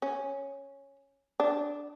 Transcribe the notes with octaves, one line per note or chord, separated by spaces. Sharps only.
C#4
D4